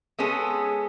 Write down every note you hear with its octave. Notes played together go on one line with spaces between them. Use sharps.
G#3 B3 C#4 G#4 A4